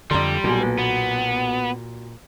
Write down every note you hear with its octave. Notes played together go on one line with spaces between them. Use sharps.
F2 D3 G3 D5 A#5 C6
B1 A#2 G#5
A#3 B4
B3 F#4